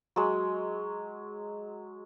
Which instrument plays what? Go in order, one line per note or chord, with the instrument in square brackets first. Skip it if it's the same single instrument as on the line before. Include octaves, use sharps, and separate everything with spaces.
[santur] F#3 G#3